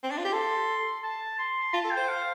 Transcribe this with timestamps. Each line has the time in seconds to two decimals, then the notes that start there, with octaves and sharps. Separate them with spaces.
0.03 C4
0.11 D4
0.18 F4
0.25 G4
0.32 A4 C6
1.03 A5
1.39 C6
1.73 F4 A5
1.85 A4
1.91 G5
1.97 C5
2.09 F5